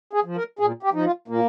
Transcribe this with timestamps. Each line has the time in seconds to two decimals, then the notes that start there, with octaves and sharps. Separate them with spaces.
0.13 G#4
0.25 F3
0.36 A#4
0.59 A#2 G#4
0.83 G4
0.93 F3 D#4
1.05 F4
1.28 A#2 A#3